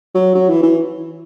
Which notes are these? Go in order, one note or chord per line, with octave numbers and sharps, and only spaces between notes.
F#3
F#3
E3
E3